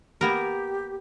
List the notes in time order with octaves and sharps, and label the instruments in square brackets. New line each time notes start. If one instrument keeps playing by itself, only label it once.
[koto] A#3 B3 A#4 [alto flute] G4